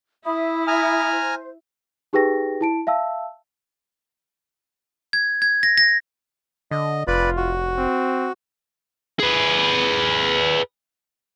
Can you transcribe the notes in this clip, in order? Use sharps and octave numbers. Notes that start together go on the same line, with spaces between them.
E4 E5 B5 D#6
G#5 A#5 F6
C5
D#4 G4 G#4 B4 G5 A#6
E4 A5 D7
E5 F5 A5 E6
G#6
G#6
A#6
A#6
D3 D#5
F1 F4 B4 D5 B5
F#4
C4
G#4 B4